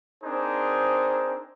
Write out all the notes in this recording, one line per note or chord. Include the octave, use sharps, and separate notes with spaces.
C4 D4 D#4 G#4 A#4 C5